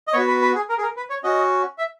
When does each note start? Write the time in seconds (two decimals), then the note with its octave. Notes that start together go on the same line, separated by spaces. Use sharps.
0.08 D#5
0.13 B3 F#4 C#5
0.28 B4
0.42 B4
0.55 G#4
0.69 A#4
0.78 G#4
0.82 A#4
0.97 B4
1.10 C#5
1.24 C#4 F#4 D#5
1.78 E5